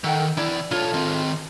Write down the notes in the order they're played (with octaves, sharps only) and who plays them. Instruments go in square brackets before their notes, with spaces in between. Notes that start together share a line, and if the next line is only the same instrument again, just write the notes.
[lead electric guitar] D#3 [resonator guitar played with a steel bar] A4 F#5 G5
[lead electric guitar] E3 D5 [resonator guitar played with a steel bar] E4
[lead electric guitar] B1 C#5 [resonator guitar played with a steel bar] F4 A4
[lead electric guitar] D#3 C4